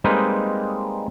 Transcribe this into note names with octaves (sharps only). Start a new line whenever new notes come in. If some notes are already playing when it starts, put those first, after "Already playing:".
G3 G#3 A#3 C4 D#4 B4